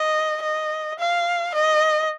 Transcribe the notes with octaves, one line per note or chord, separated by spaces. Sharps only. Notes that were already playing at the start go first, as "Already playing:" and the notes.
Already playing: D#5
D#5
F5
D#5